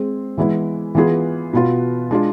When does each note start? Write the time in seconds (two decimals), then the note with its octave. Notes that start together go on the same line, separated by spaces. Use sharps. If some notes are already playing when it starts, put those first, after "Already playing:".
Already playing: G#3 C4 G#4
0.38 E3 G#3 B3 E4
0.95 E3 B3 F4 G#4
1.53 B2 B3 F4
2.11 G#3 D4 F4